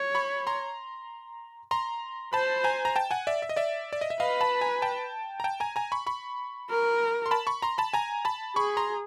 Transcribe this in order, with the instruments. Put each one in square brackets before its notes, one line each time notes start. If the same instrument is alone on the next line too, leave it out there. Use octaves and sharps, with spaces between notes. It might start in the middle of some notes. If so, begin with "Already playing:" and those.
Already playing: [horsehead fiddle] C#5
[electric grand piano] B5 C#6
A#5 C6
A#5 C6
[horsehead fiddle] C5 [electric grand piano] A5 B5
[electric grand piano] G#5 A#5
A#5
G5 A5
F#5 G#5
D5 E5
E5
D#5
D5 E5
D5
D#5
E5
[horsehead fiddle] B4 [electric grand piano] D#5 F5
[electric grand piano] A5 B5
G#5 A#5
G5 A5
A#5
G5 A5
G#5 A#5
G#5 A#5
B5 C#6
B5 C#6
[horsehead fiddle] A#4
[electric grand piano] C6
A5 B5
B5 C#6
A#5 C6
A5 B5
G#5 A#5
A5 B5
[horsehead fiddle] G#4 [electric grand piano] B5 C#6
[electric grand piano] A#5 C6